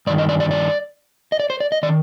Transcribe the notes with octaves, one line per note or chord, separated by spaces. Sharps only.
G2 D#3 D5
D#5
D5
D5
D5
D#5
D5
C5
D5
D#5
D#3 D5